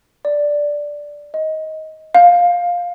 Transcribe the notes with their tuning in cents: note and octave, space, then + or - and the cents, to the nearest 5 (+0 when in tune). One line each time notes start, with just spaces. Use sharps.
D5 +0
D#5 +15
F5 +10